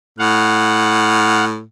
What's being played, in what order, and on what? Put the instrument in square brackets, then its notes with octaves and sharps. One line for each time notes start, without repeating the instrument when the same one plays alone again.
[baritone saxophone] A2 [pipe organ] F5 F#5